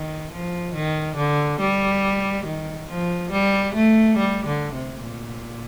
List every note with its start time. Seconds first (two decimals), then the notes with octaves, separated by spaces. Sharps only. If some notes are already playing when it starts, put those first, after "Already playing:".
Already playing: D#3
0.32 F3
0.75 D#3
1.17 D3
1.60 G3
2.46 D#3
2.89 F3
3.32 G3
3.75 A3
4.18 G3
4.46 D3
4.74 C3
5.03 A#2